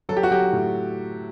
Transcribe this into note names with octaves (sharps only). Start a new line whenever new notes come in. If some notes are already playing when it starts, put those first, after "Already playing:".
F#3 A4
G4
F#4
F#3 G4
A2